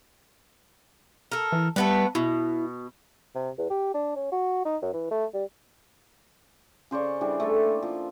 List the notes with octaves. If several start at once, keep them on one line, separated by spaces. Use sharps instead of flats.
A4 A#4
E3
G3 A3 B3 B4
B2 E4
C3
E2
G4
D4
C#4
F#4
D#4
F#2
E3
A3
G3
C#3 C5 D5 C#6
E3 G3 D4 G#4
A3 E4 A4
A#3
F3